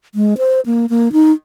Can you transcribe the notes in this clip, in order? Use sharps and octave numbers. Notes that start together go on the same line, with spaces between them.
G#3
C5
A#3
A#3
D#4